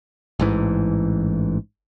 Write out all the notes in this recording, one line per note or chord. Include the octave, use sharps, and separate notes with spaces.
A1 G#2 E3